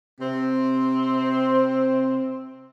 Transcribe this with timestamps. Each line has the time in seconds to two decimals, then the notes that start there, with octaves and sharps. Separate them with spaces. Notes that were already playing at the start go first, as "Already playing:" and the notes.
0.21 C3 C4